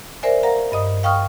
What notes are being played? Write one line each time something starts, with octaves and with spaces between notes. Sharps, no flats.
A#4 C5 D5 E5 G#5
A#4 F5 F#5 A#5
G2 D#5 D#6
F5 G5 C#6 D#6 F6